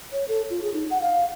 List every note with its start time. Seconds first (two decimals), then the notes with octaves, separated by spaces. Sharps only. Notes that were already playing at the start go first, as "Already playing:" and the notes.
0.12 C#5
0.28 A4
0.50 F4
0.62 G#4
0.74 D#4
0.90 F#5
1.02 F5